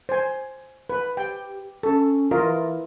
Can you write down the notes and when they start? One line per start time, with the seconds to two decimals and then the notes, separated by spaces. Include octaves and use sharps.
0.09 C5 G#5
0.90 B4
1.17 G4 G5
1.83 C#4 A4
2.31 E3 F4 A#4 D#5